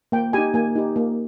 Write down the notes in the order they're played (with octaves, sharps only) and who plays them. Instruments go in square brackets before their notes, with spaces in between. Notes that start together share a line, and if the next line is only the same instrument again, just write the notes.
[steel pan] A#3 G5
D#4 G4 G#5
A#3 G#5
D#4 G4
A#3